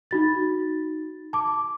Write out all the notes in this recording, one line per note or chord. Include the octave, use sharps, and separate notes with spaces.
D#4 F#4 A6
A5 D6